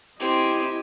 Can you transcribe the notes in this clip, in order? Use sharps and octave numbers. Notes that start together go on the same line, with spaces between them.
C4 E4 G4 D#5 G#5